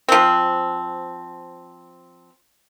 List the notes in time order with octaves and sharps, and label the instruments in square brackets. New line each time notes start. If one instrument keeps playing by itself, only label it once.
[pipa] F3 C4